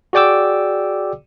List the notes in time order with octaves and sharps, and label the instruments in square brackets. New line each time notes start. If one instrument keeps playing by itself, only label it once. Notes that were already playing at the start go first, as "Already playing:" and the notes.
[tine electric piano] F#4 G#4 D5 G5 D6 E6